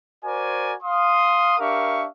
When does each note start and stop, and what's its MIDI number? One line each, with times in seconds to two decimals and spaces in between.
0.24 0.73 66
0.24 0.73 70
0.24 0.73 72
0.24 0.73 74
0.24 0.73 80
0.83 1.55 77
0.83 1.55 84
0.83 1.55 87
1.59 2.06 62
1.59 2.06 67
1.59 2.06 70
1.59 2.06 76
1.59 2.06 77
1.59 2.06 85